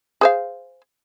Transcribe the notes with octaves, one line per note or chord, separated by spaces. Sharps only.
G#4 C5 F5